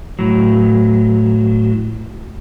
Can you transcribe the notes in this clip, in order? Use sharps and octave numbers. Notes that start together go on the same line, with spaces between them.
A2 F#3